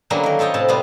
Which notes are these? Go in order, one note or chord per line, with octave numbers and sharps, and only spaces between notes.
D3 F#3 G3 A#3 B3 C#4
D#3 A#4
F4 A4 C#5 D#5 G5
A2 C3 A5
C3 G3 B3 F4